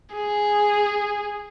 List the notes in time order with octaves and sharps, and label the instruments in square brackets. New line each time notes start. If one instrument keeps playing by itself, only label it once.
[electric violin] G#4